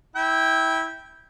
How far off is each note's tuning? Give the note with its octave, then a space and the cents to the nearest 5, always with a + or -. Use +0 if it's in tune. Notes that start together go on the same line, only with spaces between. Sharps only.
E4 -20 G5 +0